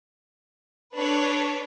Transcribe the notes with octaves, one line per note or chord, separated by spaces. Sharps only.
D4 A4 B4 C#5